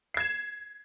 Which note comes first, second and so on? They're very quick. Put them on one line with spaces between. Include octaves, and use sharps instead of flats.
C7 G#6 E7